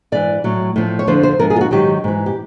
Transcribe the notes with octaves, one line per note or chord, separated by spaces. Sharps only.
G#2 E3 D5
A2 F#3
A2 F3
C#5
F2 D3 F3 C5
C5
G#2 F3 A#4
G#4
F4
F#4
G#2 D#3 F#3 G4
G#2 E3
G4